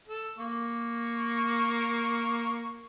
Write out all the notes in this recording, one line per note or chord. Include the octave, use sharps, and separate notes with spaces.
A4
A#3 C#6